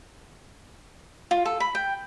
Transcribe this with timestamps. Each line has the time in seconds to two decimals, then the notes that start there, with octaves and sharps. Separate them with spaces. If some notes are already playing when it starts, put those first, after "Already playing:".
1.31 F4
1.46 A4
1.60 B5
1.75 G5